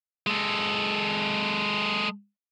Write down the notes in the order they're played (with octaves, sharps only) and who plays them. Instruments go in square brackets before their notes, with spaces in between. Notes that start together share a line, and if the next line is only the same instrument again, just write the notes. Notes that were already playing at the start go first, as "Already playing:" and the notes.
[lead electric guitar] G#3 A4